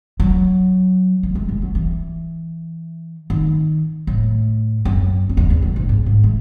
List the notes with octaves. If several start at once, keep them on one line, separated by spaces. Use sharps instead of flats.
F#3
G#3
G#3
G#3
F#3
E3
D#3
A2
F#2
F#2
E2
E2
F#2
G#2
G#2
G#2
E3